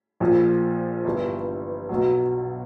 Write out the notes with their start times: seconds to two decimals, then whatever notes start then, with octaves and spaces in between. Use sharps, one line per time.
0.20 A#1 A#2 F3
1.05 G1 G2 E3
1.89 B1 B2 F#3